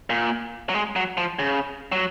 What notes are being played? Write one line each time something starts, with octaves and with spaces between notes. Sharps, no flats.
A#2
F#3
G#3
F#3
F3
C#3
F#3